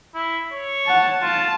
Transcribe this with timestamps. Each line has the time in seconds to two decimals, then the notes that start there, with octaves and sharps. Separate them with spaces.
0.15 E4
0.53 C#5
0.86 F#5 A5
1.22 F4 A5